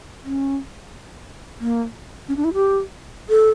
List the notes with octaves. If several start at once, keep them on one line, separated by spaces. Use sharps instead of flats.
C#4
A#3
C#4
D4
E4
G4
A4